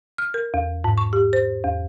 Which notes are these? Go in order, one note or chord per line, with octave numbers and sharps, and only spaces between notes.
F6
A#4
E2
G#2
C#6
G4
C5
E2